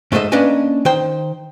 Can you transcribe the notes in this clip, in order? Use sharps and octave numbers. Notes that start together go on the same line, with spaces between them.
G#2 A3 A4 C5 D#5 E5
A#3 C#4 D4 B4 D#5 G#5
D#3 C5 G5